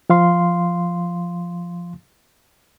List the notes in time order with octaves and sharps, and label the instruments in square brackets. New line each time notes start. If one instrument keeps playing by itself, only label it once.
[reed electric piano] F3 F5 C6